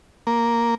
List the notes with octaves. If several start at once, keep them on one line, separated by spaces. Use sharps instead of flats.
A#3